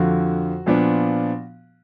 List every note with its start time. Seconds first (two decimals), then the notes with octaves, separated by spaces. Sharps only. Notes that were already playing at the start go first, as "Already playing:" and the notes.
Already playing: F2 D3 F3 F#4
0.66 A#2 F3 B3 D4